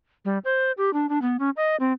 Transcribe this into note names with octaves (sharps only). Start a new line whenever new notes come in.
G3
C5
G4
D4
D4
B3
C#4
D#5
C4